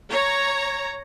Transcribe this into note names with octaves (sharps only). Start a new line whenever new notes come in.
C#5 A#5